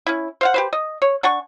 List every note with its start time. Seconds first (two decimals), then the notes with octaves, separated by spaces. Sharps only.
0.06 C#4 E4
0.41 C5 F5 F#5
0.54 G4 B4 C5
0.73 D#5
1.02 C#5
1.23 D4 F#5 G#5 C#6